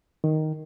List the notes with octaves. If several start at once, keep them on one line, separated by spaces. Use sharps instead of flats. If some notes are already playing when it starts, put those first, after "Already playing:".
D#3